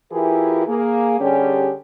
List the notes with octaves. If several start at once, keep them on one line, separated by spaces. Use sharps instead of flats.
E3 E4 F4 G4 G#4 A#4
A#3 G#4
D3 G3 C#4 G4 G#4